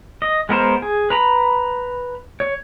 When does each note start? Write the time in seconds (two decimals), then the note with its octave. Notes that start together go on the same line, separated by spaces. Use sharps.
0.22 D#5
0.49 G#3 B3 A#4 C5
0.82 G#4
1.10 B4 A#5 B5
2.40 C#5